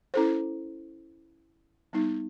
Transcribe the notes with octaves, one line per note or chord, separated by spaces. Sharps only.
C#4 E4 A4 C5
G3 B3 D#4